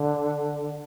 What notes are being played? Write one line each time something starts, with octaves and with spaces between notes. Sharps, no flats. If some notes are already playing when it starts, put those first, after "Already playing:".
Already playing: D3